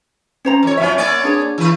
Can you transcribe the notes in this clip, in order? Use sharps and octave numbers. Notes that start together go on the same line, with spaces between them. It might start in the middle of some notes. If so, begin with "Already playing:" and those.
C#4 C5 A#5
F2 C#5
F#2 F3 C#4 E5
A#3 C#4 D5
D4 G#4 C#5
E3 B4